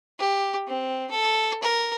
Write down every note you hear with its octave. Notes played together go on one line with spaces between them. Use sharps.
G4
C4
A4
A#4